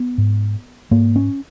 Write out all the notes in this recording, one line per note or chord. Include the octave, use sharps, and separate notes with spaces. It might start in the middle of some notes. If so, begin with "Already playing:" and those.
Already playing: B3
G#2
G#2 A#3
C#4